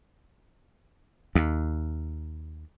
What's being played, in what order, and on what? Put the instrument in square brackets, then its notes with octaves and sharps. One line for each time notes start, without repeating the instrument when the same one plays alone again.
[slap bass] D#2